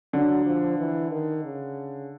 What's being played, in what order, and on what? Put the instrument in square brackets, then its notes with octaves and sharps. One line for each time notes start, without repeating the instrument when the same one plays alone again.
[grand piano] D3 [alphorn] F#3
[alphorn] F3
E3
D#3
C#3